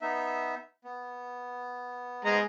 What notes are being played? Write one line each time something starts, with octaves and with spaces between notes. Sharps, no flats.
B3 D#4 E5
B3
G#3 B3 A#5